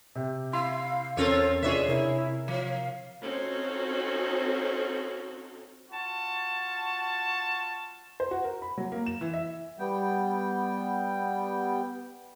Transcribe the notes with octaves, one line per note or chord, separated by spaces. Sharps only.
C3 G4
E4 F5 C6
E2 C4 C#4 F4 A4 A#4 C#5
F1 D4 F4 G#4 C#5 D5 E5
C3 E4 A#4
F3 F5
C4 C#4 D#4 F4 F#4 A4
F4 F#4 A5
C5
F#4
A#4
B5
F#3
A#3
E7
E3
E5
G3 B3 G5